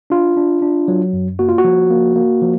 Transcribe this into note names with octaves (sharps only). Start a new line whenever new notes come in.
D4 F4
D4
D4
F#3
F#2
A#3 F#4
F4
F#4
F3
A#3
A#3
F3